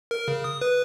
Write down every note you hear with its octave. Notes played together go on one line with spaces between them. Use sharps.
A#4
C#3
D#6
B4